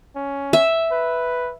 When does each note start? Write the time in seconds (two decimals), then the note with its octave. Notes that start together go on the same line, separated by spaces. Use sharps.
0.16 C#4
0.53 E5
0.91 B4